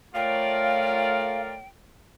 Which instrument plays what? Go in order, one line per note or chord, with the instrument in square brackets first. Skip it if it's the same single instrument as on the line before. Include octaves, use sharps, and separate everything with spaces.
[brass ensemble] A3 C#5 [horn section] F4 A#4 D5 [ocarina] F5 [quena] G5